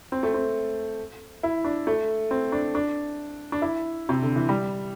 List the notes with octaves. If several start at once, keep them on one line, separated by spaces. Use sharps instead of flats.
C4
A3
C4
E4
D4
A3
C4
D4
D4
D4
E4
C3
D3
E3
G3